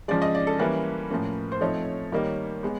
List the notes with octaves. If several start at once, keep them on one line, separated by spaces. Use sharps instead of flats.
C#3 F3 G#3 D5
D#5
D5
A4
E3 G3 A#3 C#4 B4
A2 F3 A#3 C#4
C5
F3 A3 C4 D#4 C#5
D#3 G3 A#3 D#4
G#3 B3